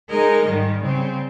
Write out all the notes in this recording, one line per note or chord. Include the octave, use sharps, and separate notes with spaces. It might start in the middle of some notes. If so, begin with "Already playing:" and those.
G#3 D#4 A#4 D#5
G#2 D#3 G3
C#3 G3 C4